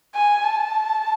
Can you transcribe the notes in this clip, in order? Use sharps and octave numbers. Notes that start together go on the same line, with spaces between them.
G#5
A5